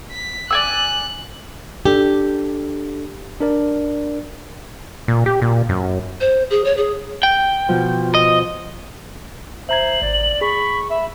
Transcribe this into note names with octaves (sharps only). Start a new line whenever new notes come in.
B6
D5 G#5 E6 F#6
D4 G4 A4
D4 A#4 D5
A#2
G4
A#2
F#2
C5
G#4
C#5
G#4
G5
B2 F3
D#5
C5 E5 A#5 G#6 F#7
G#1 D5
G#4 B5 C#6
E5 B5